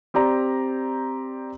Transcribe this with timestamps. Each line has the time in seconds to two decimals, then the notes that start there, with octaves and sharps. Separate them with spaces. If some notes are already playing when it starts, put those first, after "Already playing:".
0.14 C4 G4 D5 A#5